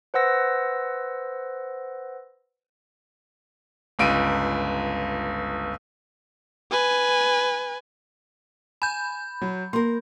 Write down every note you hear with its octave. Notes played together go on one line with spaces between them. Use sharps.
B4 C5 F#5 E6 A#6
G1 C#2 D7 D#7
B4 G#5
G#5 B5 G6
F#3
A#3 A#4 C6